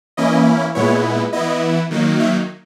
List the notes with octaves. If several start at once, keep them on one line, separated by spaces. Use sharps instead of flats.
E3 A#3 C#4 E4 D#5
A#2 G#3 B3 E4 C#5
E3 B3 E4 D#5
D#3 F#3 A#3 D#4
E5